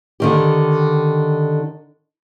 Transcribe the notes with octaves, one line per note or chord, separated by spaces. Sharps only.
D3 D#3 G4